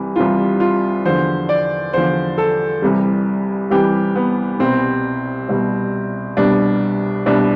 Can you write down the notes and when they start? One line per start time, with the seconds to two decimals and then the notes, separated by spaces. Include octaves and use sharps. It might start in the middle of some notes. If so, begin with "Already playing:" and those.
Already playing: C2 C3 E3 G3
0.16 C2 C3 E3 G3 F4
0.60 F4
1.05 E2 D3 F3 C5
1.49 D5
1.93 E2 D3 F3 C5
2.38 A4
2.82 C2 C3 E3 G3
3.71 C2 C3 E3 G3 G4
4.16 B3
4.59 C2 B2 G3 C4
5.48 C2 B2 G3
6.37 C2 B2 G3 D4
7.26 C2 B2 G3 D4